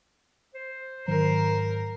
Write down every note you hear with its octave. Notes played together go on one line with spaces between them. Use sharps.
C5
G#2 D#3 F#3 A#4 C5